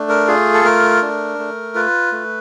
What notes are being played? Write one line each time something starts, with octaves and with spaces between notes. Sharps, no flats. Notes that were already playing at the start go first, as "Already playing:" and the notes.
Already playing: A3 D4
A#4
F4 G#4
A4
A3 A#4
D4
A3
F4 B4
A3